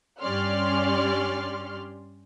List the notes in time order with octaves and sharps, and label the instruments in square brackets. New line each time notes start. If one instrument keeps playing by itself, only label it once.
[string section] G2 C#4 G4 D5 C6 F6